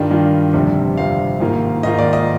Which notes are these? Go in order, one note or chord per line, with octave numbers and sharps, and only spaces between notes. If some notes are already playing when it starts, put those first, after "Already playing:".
Already playing: G2 D#3 G3 D4 F4 D#5
G2 D#3 G3 D4 F4
G1 F2 C3 G3
G1 F2 C3 G3 F5
G#2 D#3 A#3 F4
G#2 D#3 A#3 F4 D#5
D5
D#5